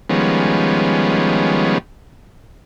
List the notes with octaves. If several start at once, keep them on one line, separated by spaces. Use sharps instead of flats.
D#3 F3 G3 G#3 B3 C#4